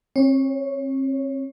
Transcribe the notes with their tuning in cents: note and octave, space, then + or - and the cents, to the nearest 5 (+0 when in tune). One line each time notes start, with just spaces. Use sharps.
C4 +40 C#5 +0